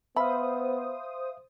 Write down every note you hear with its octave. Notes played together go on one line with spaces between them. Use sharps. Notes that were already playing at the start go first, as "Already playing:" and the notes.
B3 C5 E5 F5 B5 D#6